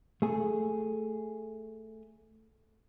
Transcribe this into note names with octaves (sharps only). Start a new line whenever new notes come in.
A3 G#4